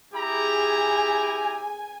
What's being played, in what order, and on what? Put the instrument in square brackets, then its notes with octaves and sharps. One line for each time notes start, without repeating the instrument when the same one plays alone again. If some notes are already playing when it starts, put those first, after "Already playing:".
[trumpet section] E4 G4 A#5 [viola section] G#4 [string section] G#5